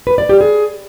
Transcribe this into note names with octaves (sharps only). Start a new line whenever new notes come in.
B4
D5
G4
G#4